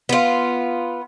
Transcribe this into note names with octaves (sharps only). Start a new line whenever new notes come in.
B3 F4